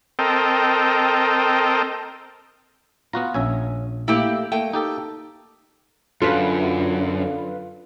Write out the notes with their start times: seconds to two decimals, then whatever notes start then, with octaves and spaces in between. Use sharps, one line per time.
0.19 C4 A4 A#4 D#5 G5
3.13 B3 F4 F#4 A#5
3.34 A#1 C#4 E5 G#5
4.08 A3 A#3 E4 G4
4.52 A3 A#3 G5
4.73 D#4 G4 A4
6.22 F#2 D3 F#3 F4 A4 B4